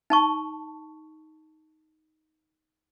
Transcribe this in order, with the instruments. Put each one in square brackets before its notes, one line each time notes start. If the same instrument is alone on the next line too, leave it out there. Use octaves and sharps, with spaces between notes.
[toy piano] D#4 A5 C#6